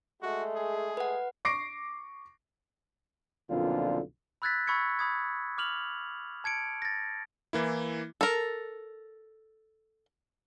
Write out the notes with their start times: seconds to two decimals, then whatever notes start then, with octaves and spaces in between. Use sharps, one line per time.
0.22 G#3 A3 F#4
0.55 G#4
0.97 B4 F#5
1.45 C#6 D6 A#6 C7 D7
3.49 B1 F2 A#2 D3 F4
4.42 B5 E6 F#6 G#6 A6 B6
4.67 B5 C#6 E6 G#6 C#7
4.99 B5 D#6 G#6
5.58 D6 F6 F7 F#7
6.44 A5 G#6 C#7 D7
6.82 A6 A#6
7.53 E3 A#3 E4
8.21 A4 A#4